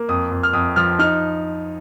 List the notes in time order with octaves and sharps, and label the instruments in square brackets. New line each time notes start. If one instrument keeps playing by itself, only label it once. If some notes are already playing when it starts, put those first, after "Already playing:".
Already playing: [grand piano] A#3
F2 D#6
F2
F6
F2 D#6
F3 F6
D#4 F6